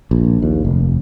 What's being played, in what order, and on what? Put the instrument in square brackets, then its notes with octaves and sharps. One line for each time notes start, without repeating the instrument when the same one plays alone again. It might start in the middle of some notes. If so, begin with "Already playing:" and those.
[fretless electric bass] A#1
D#2
F1